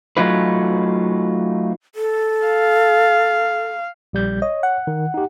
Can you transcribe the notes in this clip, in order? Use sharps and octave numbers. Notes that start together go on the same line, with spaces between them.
F#3 A3 D#4 F4 B4
A4
F5
A#1 G3 G6
C#5 D#5
F#5
D#3
D#4 G4